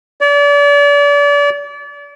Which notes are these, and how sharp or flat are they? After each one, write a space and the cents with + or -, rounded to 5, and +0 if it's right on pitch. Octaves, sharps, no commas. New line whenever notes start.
D5 -35